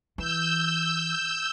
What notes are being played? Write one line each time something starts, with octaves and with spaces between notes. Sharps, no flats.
E3 E6 G6